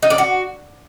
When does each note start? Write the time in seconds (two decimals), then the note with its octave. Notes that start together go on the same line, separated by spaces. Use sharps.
0.02 D#4
0.10 D5
0.18 F#4